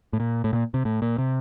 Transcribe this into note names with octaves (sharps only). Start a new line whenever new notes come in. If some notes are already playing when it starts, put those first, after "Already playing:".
A2
A#2
A2
A#2
C3
A2
A#2
C3